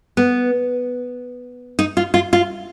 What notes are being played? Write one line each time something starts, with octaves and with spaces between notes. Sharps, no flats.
B3
D#4
F4
F4
F4